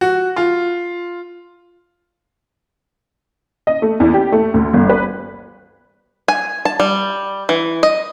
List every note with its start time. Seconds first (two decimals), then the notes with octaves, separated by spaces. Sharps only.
0.01 F#4
0.36 F4
3.67 D#5
3.82 A3
4.00 E2
4.14 G4
4.32 A3
4.54 D2
4.73 G1
4.89 B4
6.28 G#5
6.65 A5
6.80 G3
7.49 E3
7.83 D#5